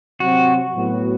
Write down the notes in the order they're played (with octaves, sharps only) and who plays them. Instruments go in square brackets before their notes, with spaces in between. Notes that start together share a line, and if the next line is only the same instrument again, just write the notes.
[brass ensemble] C3 F#3 C4 [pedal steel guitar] F#4
[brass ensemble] A2 F#3 B3 F#4